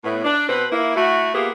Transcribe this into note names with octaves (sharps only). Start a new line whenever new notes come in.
A2 B3
D4
B2 C4 B4
A#3 E4
A3 E4 F#4
A#3 B3 F4 G4 G#4